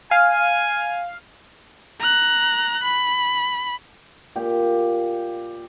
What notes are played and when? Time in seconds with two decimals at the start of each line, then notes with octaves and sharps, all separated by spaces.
0.11 F5 G#5
2.00 A#5 F#6
2.83 B5
4.36 A#2 G4